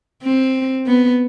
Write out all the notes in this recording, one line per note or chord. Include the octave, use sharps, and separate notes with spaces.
C4
B3